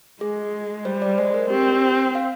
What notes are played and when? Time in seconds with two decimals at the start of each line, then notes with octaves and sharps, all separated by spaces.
0.21 G#3 G#4
0.85 G3 C5
1.02 D5
1.18 G#3 C5
1.34 A#4
1.50 C4 G4
2.15 F5